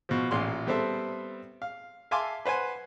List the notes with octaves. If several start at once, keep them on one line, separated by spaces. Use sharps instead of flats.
B2 F3
A1 A#2 C6
G3 B3 C4 A4 C5 E5
F5
E5 F5 G#5 A5 C6 D6
B4 C5 F#5 G#5